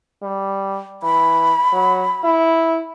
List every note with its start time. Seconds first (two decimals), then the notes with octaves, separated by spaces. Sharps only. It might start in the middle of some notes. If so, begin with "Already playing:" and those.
0.23 G3
1.03 E3 B5
1.72 F#3
2.24 E4